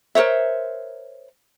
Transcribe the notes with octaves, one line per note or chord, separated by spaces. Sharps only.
A#4 C5 C#5 E5